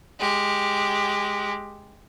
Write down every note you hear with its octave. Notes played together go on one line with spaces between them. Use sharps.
G#3 G4